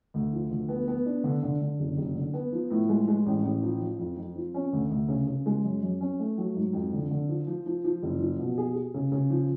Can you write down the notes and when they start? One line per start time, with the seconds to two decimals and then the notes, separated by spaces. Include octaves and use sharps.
0.14 D2
0.33 F3
0.51 D2
0.68 B3
0.88 B3
1.06 D4
1.24 D3
1.43 D3
1.61 D3
1.80 F#1
1.97 F#1
2.15 D3
2.33 B3
2.52 F3
2.70 A2
2.89 G#3
3.08 G#3
3.26 A1
3.43 A1
3.62 F3
3.81 F3
3.99 F2
4.17 F2
4.36 F3
4.54 C#4
4.73 D2
4.90 D2
5.08 C#3
5.27 C#3
5.46 G#3
5.64 F#2
5.83 F#2
6.01 C#4
6.19 A3
6.38 F#3
6.55 G#2
6.73 F2
6.93 D3
7.11 D3
7.29 F3
7.47 F3
7.66 F3
7.84 F3
8.03 F#1
8.21 F3
8.39 B2
8.58 G#4
8.75 G#4
8.94 C#3
9.12 C#3
9.30 F3